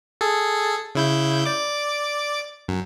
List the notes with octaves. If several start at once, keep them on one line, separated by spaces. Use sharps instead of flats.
G#4 A4
C#3 E4 G6
D5 D6
F#2